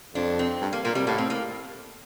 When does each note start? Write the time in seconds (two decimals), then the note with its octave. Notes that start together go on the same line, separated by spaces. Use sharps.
0.15 F2 D4
0.39 C4
0.61 G2
0.73 A#3
0.84 A#2 A#3
0.95 C3 G3
1.07 A2 A#3
1.18 C4
1.30 A#3